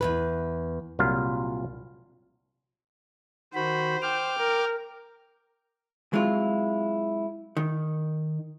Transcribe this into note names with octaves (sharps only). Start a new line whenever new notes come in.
E2 B2 B4
C2 A#2 F#3 F4 F5
D#3 F#4 C5 B5
G5 D6 F6
A#4
F#3 G#3 C4 E4 F4
D#3